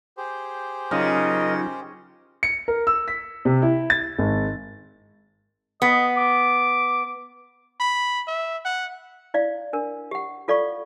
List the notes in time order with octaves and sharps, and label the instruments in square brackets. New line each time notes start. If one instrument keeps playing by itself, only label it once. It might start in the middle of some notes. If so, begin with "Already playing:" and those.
[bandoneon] G4 G#4 C5
[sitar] C#3 [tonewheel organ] F#3 D#4 F4 [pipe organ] A#4 D#5
[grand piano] C#7
A#4
E6
B6
C3
E4
A6
G#1
[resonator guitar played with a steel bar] B3 [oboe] D#5
[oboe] D6
[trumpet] B5
E5
F#5
[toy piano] E4 D5 F5
D4 A#4
G4 F#5
F4 A4 D5 F5 C#6